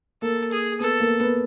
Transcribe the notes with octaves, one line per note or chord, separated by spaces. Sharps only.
A#3 A4
G#4
B3 A4
A#3
B3